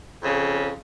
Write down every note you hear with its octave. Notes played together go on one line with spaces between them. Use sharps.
F2 C#3